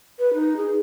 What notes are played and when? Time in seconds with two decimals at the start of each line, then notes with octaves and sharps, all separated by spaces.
0.19 B4
0.34 D#4
0.57 G#4